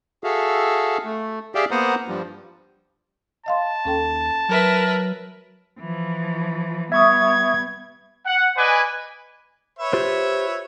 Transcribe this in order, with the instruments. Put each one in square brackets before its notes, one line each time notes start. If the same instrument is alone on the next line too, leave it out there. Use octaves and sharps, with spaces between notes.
[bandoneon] F#4 G#4 A4 E5 F5
A3
G4 G#4 D5 E5 F5 G5
A#3 B3 C5 F#5 A#5 D#6
G2 F3 G3
[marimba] D#5 F5 C6 [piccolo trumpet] A5
[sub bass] D#2 [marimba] C#4 A4 G5
[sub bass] F#3 [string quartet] A#4 B4 E5
[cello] E3 F3
[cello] G3 B3 [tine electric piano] E5 C#6 D#6 [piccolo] G#6
[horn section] F#5
B4 D5 D#5 G#5
[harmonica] B4 C#5 E5
[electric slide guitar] F4 G4 C5